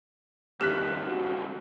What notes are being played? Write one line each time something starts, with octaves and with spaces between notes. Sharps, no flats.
C#2 G2 D#3 G4 F6 F#6 B6
F#4